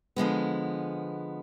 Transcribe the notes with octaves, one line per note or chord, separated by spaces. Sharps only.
D3 F3 G#3 B3